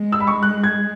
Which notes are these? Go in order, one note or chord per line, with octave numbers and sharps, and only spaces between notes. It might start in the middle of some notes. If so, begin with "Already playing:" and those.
Already playing: G#3
E6
B5
C#6
F#6
G#6